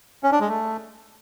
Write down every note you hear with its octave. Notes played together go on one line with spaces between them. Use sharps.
C#4
D4
G#3
A3